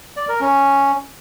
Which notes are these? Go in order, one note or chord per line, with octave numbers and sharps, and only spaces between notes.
D5
A#4
C#4